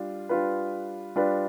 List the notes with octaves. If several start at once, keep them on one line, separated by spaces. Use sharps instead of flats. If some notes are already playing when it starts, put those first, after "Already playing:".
Already playing: G3 D4 F4
G3 D4 F4 B4
G3 D4 F4 B4